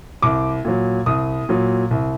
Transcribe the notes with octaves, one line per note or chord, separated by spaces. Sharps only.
C2 D6
A#2 F#3
C2 D#6
A#2 F#3
C2